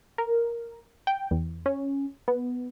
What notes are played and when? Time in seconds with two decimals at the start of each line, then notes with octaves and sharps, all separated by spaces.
0.18 A#4
1.07 G5
1.31 E2
1.66 C#4
2.28 B3